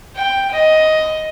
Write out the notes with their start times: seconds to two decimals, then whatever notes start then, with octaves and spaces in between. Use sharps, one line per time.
0.16 G5
0.52 D#5